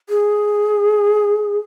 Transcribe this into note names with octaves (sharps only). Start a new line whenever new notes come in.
G#4